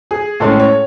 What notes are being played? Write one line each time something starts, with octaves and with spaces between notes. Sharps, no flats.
G#4
A2 G#3 C#4 A4
C#5